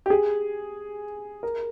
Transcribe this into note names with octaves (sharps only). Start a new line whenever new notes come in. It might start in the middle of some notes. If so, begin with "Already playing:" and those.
G4
G#4
A#4